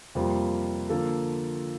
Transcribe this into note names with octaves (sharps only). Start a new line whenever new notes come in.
F2 C3 G3 A#3 F4
D3 F3 A#3 F4 A4